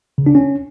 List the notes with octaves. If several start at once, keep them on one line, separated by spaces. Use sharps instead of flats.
C#3
D4
C#4